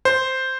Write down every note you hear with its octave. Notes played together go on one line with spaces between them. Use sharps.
C5